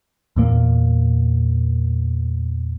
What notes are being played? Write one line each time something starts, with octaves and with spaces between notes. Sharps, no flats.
E2 A#2 A#3